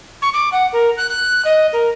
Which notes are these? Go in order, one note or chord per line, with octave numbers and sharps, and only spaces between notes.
C#6
D6
F#5
A#4
F#6
F#6
D#5
A#4